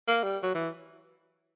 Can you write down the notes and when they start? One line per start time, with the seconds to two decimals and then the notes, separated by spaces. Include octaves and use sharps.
0.08 A#3
0.24 G3
0.43 F#3
0.55 E3